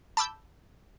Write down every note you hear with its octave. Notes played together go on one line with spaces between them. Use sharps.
A5 B5 D6 E6 G6